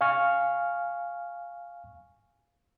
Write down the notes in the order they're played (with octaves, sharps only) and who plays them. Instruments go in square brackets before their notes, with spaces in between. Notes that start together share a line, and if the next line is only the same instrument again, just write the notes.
[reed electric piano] F5 G#5 C#6 F6